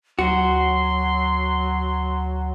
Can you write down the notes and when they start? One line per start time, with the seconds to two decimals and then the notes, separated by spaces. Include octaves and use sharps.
0.19 D2 F#3 F#4 C6